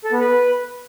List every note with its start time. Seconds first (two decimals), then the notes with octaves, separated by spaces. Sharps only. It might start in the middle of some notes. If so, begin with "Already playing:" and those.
0.04 A4
0.12 B3
0.20 B4